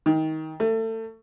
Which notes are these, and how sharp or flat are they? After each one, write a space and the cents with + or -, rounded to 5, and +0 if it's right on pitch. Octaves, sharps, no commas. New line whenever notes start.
D#3 +20
A3 +30